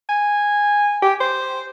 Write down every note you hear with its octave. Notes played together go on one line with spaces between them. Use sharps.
G#5
G4
C5